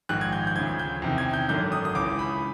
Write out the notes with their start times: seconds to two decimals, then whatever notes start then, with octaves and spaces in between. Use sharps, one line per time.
0.09 A#1 G#2 D#3 F#6
0.21 G#6
0.32 G6
0.47 G6
0.56 D2 C#3 F3 G#6
0.79 G6
1.02 E2 C3 D#3
1.18 G#6
1.33 G6
1.49 G#1 F#2 D3 G6
1.72 D#6
1.85 D#6
1.95 C#2 C#3 E3 D6
2.19 B5